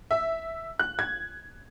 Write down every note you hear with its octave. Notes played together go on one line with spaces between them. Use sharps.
E5
F#6
G#6